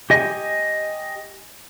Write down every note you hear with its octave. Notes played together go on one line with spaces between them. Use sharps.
G4 D#5 G#5